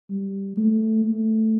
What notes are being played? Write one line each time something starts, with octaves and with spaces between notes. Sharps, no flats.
G3
A3
A3